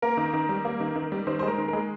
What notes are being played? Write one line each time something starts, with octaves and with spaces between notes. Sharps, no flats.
A#3 A#4
D#3
D#3
G3
A#3
D#3
D#3
G3
D#3 C5
C5
G#3
A#4
D#3
G#3 A#4